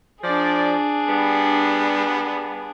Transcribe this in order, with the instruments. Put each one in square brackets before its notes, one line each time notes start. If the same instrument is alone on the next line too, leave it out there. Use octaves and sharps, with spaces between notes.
[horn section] F3 D5 [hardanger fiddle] D4 G#4
[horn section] G3 B3